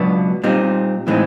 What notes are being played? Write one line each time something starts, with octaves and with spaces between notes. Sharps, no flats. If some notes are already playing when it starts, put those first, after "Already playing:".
Already playing: C#2 B2 F#3 B3 D4
A#2 G3 C4 D#4
A2 E3 G#3 C4 D#4